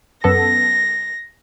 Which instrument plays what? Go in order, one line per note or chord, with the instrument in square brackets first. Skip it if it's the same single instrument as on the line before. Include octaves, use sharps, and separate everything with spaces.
[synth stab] F#2 B3 A4 [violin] A#6